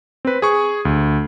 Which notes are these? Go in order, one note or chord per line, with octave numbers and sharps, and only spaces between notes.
C4 B4
G#4 C#6
D2